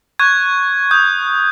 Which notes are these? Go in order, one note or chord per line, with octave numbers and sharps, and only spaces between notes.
C#6 F#6 G#6
D#6 G6